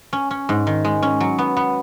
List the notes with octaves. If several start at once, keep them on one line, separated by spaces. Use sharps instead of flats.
C#4
C#4
G#2
D#3
G#3
C#4
F#3
B3
B3